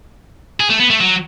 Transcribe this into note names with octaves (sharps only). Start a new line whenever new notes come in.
G#4
A3
B3
A3
F#3